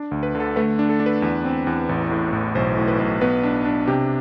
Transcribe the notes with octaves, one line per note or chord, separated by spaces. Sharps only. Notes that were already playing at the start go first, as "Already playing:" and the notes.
Already playing: D4
D2
B4
D3
A4
A3 B4
D4
A4
D4
B4
E2
C4
E2
A1
A2
A1
B1 C5
A2
B4
B1
B3 B4
D4
D4
C3 G4